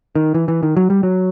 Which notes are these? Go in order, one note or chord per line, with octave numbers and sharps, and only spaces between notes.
D#3
E3
E3
D#3
F#3
G3
F#3